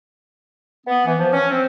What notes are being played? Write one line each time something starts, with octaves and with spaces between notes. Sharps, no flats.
B3
E3
F3
C#4
C4